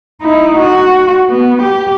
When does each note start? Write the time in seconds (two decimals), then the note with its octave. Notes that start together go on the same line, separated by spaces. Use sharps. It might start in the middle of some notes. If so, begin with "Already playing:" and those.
0.22 D#4 E4
0.58 F#4
1.29 B3
1.63 G4